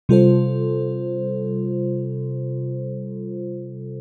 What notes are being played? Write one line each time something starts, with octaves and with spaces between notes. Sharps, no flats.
C3 G3 F4 A4 C5